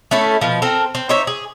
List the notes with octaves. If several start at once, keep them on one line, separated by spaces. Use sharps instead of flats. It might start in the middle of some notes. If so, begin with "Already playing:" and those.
A3 C#4 E4 A4
B2 F3
C4 A4 A#4
C4
D#4 C5 C#5 E5
G#4